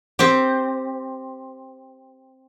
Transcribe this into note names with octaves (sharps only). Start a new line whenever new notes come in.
C4 G4